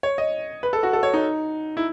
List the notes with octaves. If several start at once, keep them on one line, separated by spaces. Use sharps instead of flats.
C#5
D#5
B4
A4
F#4
A4
C#5
D#4
E4